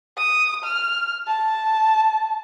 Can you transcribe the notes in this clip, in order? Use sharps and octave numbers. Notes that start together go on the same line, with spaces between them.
D#6
F6
A5